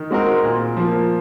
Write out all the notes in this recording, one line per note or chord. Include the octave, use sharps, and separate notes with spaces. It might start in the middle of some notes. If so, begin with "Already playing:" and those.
Already playing: D#3
G#3 C4 F#4 A#4
A#2
F3 A#3